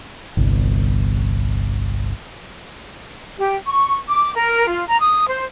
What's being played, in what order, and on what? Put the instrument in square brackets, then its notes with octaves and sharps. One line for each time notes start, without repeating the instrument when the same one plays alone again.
[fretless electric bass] G1 C2
[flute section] G4
C#6
D6
A#4
F4
A#5
D#6
C5